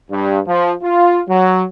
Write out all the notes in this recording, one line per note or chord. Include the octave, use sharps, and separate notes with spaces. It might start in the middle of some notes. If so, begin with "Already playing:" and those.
G2
F3
F4
F#3